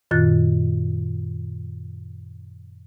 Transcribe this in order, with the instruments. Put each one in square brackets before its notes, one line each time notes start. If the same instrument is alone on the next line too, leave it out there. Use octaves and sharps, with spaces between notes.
[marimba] F#2 A#2 D#3 F4 F#6 A6